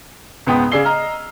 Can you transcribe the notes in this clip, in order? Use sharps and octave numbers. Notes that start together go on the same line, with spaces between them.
C#2 G#2 B3 G5 B5 D#6
C#3 G#4 D5 E6 C7 G7
D#5 A#5 F6